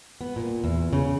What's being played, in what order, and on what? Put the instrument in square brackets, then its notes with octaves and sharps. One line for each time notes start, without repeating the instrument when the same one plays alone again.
[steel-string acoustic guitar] B3
A#2
E2
C#3